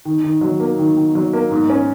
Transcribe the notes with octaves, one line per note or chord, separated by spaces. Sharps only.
D#3
D#3
F#3
A#3
D#3
D#3
F#3
A#3
G#2
C#4